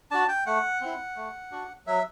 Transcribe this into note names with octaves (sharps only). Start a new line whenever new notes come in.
D4 F#4 A5
G5
A3 F#5
C4 E4
A3
D4 F#4
F#3 E5